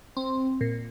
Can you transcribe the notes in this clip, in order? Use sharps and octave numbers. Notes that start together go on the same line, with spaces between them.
C4
A#2